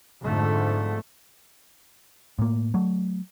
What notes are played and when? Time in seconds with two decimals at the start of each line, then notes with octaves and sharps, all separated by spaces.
0.24 F2 G#2 D3 A3
2.39 A2 A#3
2.74 F#3 A3